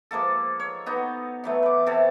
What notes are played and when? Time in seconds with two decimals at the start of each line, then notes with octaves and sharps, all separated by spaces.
0.11 F3 G#3 A#3 A4
0.60 C#5
0.86 B3 D#4 F#4
1.44 E3 F#3 A3
1.63 B4 D6
1.86 C3 E3 A4